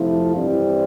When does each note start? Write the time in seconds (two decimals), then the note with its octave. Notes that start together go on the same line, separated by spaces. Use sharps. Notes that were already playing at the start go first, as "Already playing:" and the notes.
Already playing: F2 C3 F3 A3 E4
0.35 G2 E3 G3 C4